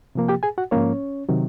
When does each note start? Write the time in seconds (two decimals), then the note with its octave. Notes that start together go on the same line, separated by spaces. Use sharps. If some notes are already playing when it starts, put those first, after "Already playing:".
0.15 C3 F3 A#3
0.28 G4 G5
0.43 G#4 G#5
0.58 F#4 F#5
0.71 G#2 F3 A#3 C#4 C#5
1.29 C3 D#3 F#3